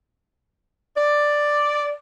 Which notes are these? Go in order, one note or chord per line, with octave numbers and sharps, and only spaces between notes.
D5